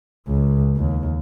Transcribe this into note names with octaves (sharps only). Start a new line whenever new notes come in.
C#2
D#2